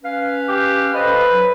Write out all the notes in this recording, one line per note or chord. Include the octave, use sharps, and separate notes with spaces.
C#4 B4 F5
G4
A4 B4 C5 D#5
F#3